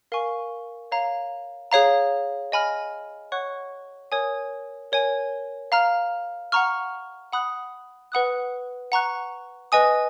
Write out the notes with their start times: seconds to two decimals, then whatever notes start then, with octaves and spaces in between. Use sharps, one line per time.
0.12 A#4 F5 G#5 C#6
0.92 C#5 F5 A#5
1.72 G#4 C#5 F5 A#5
2.52 D#5 G#5 B5 F6
3.32 C#5 F#5 C#6 F#6
4.12 A#4 C#5 G#5 D#6
4.92 A#4 C#5 G#5
5.72 F5 A#5 F6
6.52 F#5 A#5 C#6 F6
7.33 F#5 B5 D#6 F#6
8.12 B4 F#5 B5 D#6 F#6
8.92 F#5 A#5 C#6 F#6
9.72 B4 D#5 G#5 D#6